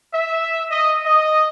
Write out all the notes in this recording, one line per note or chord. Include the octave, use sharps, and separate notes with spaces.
E5
D#5
D#5